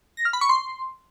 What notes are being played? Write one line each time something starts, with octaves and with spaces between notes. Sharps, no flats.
A#6
F6
B5
C#6
C6